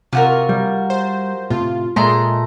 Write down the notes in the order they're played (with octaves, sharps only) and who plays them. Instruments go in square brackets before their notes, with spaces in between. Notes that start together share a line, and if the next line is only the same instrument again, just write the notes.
[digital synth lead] C3 [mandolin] F4 F#4 A#4
[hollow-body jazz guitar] G3
[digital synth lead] C5
[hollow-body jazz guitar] A2 C3 [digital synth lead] F4
[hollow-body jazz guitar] A#2 [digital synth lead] G#3 [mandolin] A3 A#5 C6